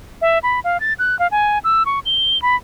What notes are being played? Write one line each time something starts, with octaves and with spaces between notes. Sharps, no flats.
E5
B5
F5
A6
F#6
F5
G#5
E6
C#6
G7
B5